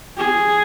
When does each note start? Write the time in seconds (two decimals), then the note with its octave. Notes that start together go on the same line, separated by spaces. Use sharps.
0.17 G#4